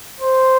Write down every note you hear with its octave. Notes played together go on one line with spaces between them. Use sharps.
C5